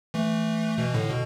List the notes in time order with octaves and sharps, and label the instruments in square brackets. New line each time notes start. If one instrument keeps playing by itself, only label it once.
[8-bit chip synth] E3 A3
B2 E3
A2 D3
B2